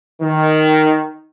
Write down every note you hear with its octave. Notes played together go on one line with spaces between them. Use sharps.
D#3